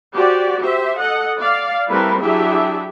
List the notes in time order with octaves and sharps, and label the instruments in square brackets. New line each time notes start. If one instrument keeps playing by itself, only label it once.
[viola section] F#4 G4 C5 D5
G4 C5 E5
A4 D#5 F#5
D5 F5
G3 A3 C4 E4 A#4 B4
F#3 D4 E4 G4 G#4 E5